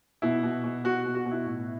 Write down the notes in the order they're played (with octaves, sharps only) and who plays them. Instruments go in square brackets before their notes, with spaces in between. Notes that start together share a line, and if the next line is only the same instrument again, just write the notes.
[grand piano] B2 E4
B2
B2
B2 F#4
B2
F#4
B2
E4
A2